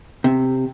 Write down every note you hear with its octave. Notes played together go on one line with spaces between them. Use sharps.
C3